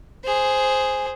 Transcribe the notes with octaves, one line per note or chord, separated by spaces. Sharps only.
G#4 C5